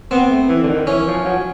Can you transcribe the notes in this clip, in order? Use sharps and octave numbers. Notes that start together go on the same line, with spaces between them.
B3 C4
A3
E3
D3
D#3
E3 C#4
F3
F#3